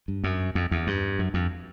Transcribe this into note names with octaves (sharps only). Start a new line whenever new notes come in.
G2
F#2
F2
E2
G2
F#2
F2